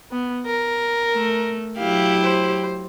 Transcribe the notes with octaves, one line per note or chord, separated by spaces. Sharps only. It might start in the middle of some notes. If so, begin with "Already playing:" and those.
B3
A#4
A3
F#3 E4 G4 F5
C5